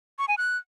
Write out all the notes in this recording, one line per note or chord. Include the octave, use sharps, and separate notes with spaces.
C#6
G#5
F#6